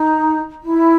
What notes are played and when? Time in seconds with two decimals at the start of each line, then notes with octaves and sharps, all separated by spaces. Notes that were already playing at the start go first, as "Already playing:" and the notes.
Already playing: D#4
0.62 E4